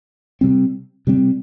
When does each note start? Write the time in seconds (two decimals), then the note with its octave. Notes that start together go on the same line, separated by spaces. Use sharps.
0.41 C3 G3 C4
1.07 C3 G3 C4